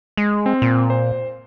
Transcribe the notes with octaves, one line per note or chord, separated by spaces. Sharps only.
G#3
C4
A#2
C5